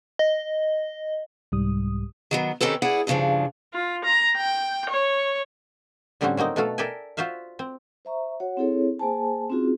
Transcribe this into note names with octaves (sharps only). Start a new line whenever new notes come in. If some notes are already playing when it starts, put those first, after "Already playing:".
D#5
C2 G#2 G3 D#6
D#3 F#3 B3
D#3 C4 C#4 G4 A4 B4
E4 G#4 D5 F#5
E2 G2 C#3 F3 D4
F4
A#5
G5
C#5
A2 D3 G3 C4 C#4 F#4
F#3 A#3 C4 D#4
B2 A3 F#4 A4 F5
A4 A#4 D5 E5 G5 G#5
F4 F#4 C5 E5 F5
C4
C5 E5 A#5 C#6
F#4 C#5 F#5
C4 E4 G#4 A4 C#5
A#3 G#4 C5 G#5 A5
C4 C#4 D#4 F4 F#4 G#4